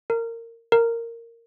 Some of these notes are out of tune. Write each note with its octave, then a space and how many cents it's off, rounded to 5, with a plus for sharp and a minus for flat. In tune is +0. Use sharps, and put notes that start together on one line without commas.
A#4 -20
A#4 -10